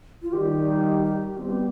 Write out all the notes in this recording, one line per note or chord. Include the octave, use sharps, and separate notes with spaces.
F4
D#3 G3 G4
G4
G3 B3 C4
G4